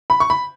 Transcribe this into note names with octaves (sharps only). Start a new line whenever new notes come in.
B5
C#6
B5